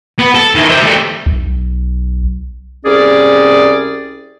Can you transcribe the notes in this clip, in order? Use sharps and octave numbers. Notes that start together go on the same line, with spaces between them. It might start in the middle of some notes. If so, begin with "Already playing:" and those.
B3
A4
D#3 E3
C5 E5
G3 A3
B1
C2 G3 C#4 G#4 D5